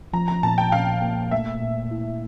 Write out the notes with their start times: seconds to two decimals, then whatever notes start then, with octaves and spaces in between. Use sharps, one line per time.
0.13 F3 A#5
0.28 A#5
0.43 A#2 A5
0.58 G5
0.72 A#2 F5
1.02 A#3
1.31 A3 E5
1.61 A#2
1.91 E4